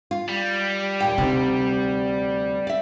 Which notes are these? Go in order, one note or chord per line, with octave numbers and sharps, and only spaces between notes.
F4
G3
D#2 A#2 G5
D2 C3 D#4
D5 E5